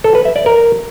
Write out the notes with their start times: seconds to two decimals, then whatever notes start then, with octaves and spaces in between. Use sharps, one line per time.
0.04 A4
0.15 B4
0.25 E5
0.36 D5
0.46 A#4